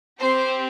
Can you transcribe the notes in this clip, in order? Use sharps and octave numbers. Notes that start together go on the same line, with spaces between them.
C4 G4 C5